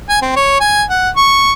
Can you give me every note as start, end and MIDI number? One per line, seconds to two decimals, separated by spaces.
0.09 0.21 80
0.22 0.35 60
0.36 0.58 73
0.60 0.83 80
0.90 1.09 78
1.16 1.52 85